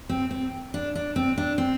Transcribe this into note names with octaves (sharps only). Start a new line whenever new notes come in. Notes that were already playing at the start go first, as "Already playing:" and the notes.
C4
C4
D4
D4
C4
D4
C4